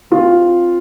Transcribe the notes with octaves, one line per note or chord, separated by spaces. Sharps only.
C4 F4